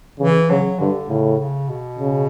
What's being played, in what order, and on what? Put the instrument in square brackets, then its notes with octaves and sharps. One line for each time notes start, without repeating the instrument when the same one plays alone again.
[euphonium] C#3 [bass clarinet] E3
[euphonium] C#3 [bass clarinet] F#3
[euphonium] G2 [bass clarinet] D3
[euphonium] A2 [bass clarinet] C#3
[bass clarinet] C#3
B2
[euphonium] C#3